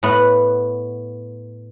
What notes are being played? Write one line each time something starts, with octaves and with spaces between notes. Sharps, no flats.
A2 B3 F#5